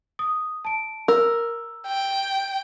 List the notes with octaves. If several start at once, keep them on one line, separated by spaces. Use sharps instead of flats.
D#6
A5 D7
A#4 E6
G5